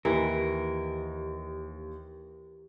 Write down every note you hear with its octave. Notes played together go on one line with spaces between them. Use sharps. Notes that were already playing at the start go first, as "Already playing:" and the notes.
D#2 E3 G4 A#4